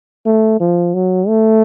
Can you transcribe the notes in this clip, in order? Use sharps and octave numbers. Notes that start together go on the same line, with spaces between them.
A3
F3
F#3
A3